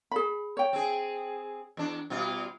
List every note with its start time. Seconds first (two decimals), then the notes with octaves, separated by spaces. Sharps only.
0.11 G#4 B5
0.57 C#5 G5
0.73 C4 G#4
1.77 E2 D4
2.10 B2 G3 F4